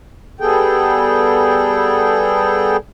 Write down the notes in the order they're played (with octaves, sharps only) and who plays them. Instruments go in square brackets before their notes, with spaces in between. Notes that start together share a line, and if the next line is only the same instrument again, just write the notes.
[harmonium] G3 B3 G#4 A4 G5